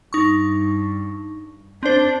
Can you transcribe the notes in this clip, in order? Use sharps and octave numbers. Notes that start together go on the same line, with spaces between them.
G2 D#4 C#6
C4 D4 C5